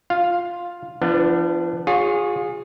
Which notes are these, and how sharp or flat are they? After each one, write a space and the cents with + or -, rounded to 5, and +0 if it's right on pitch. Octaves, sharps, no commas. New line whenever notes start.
F4 +0 F5 +0
F3 -45 B3 +0 D4 +0
F4 +35 G#4 -15 C#5 +10